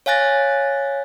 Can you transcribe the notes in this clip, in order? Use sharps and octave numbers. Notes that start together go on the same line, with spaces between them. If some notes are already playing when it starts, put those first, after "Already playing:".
C#5 F5 G#5 F#6 A6 A#6